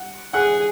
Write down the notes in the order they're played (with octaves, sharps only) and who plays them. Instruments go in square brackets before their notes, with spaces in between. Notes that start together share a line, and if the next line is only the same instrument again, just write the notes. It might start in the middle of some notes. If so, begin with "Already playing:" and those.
Already playing: [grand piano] F#5
[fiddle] G#4 [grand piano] F#5 F#6